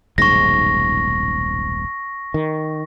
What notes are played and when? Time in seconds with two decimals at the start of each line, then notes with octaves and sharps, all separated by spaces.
0.18 D#1 B1 G#2 C#6 A#6
2.34 D#3